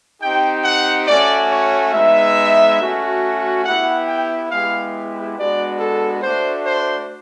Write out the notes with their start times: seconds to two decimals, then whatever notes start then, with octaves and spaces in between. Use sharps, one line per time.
0.21 C4 D#4 G4 G5
0.64 F#5
1.07 A3 C#4 F#4 D5
1.51 C#5
1.93 G#3 B3 D#4 E5
2.79 A3 C#4 F#4
3.64 B3 E4 G4 F#5
4.07 G5
4.51 G#3 B3 E4 G4 F5
5.36 G#3 B3 D4 F#4 D5
5.79 A4
6.22 A3 D4 F#4 C5
6.65 C5